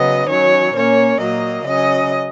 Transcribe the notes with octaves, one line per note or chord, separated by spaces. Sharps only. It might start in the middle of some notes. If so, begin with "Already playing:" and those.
Already playing: C#3 F#3 B3 D#5
D#3 F#3 C#4 C#5
A#2 A#3 C#4 C#5
A#2 F#3 A#3 D#5
C#3 F#3 C#4 D#5